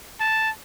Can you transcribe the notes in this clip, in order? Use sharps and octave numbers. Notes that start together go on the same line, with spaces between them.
A5